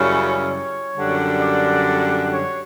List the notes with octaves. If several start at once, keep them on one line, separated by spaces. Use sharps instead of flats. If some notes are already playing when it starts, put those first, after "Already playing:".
Already playing: F#2 C#3 G3 C#4 E4
C#5
F#2 D3 G3 D4
D5
C#5